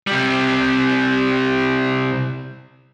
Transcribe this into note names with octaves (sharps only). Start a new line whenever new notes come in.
C3 G3